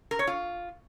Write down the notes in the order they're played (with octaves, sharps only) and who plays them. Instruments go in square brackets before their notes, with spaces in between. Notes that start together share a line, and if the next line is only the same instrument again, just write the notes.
[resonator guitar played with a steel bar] A#4
C#5
F4